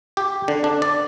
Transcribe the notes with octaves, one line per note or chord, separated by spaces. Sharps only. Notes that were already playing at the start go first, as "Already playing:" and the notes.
G4
D3
D4
D5